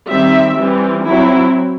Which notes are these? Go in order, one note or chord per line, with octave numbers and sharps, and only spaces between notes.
D#3 G3 C4 E5
E3 G3 C4
F#3 C4 E4